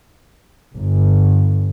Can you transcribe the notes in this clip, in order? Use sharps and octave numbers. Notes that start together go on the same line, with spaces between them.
G1